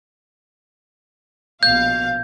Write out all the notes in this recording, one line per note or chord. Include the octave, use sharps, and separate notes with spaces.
A#1 B2 F5 G6